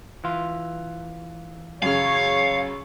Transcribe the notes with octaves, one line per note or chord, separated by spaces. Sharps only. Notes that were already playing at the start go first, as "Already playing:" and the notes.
E3 F4
F#2 C#3 C#5 F5